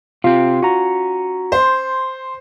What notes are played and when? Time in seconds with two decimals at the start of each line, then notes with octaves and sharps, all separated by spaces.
0.24 C3 C4 F4
0.63 C#4 F#4 A#5
1.52 C5 C6